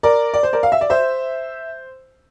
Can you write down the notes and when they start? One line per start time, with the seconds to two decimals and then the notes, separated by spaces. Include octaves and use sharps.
0.03 A#4 D5
0.34 D5
0.43 C5
0.53 A#4 D5
0.63 F5
0.72 E5
0.81 D5
0.90 C5 E5